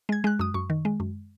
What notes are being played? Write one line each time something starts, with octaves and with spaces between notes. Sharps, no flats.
G#3 G#6
G#3 F#6
F#2 D#6
F#2 C#6
D#3
G#3
F#2